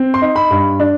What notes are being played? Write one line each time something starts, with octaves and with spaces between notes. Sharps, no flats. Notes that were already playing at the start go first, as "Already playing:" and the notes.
Already playing: C4
C6
D#4
B5
G2
D4